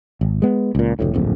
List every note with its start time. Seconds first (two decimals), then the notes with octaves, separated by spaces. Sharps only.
0.21 G#1
0.42 G#3 B3
0.75 C#2 A#2
0.99 F1 D2 A2
1.14 D1 A#1 F2